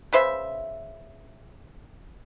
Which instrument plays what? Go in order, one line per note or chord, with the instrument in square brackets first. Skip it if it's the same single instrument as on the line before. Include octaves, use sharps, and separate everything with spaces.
[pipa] C#3 B4 C5 E5